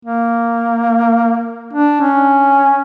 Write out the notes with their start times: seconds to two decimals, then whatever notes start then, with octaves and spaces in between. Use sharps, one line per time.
0.05 A#3
1.73 D4
2.01 C#4